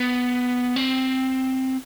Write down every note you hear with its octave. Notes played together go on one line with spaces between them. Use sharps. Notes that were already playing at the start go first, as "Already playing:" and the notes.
Already playing: B3
C4